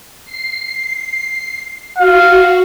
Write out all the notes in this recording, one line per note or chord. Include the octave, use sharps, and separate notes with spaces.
C7
F#4 F5